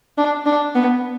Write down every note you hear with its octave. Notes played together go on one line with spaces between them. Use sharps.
D4
D4
B3